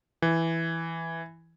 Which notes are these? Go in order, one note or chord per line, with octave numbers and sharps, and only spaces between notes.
E3